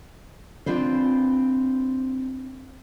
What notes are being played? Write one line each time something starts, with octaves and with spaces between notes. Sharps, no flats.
C4 D4 F4 B4 C5